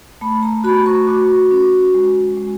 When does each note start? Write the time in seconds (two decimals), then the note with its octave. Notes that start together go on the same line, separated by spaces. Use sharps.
0.21 A3 B5
0.43 A#5
0.64 F#4 B5
0.86 C#6
1.07 F#4 D6
1.51 C#4
1.94 G#3
2.37 G#3